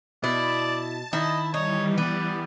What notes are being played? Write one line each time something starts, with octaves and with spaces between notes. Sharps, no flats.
B2 E4 D5 A5
D#3 E4 D#5
E3 G3 D#4 C#5
B3 D5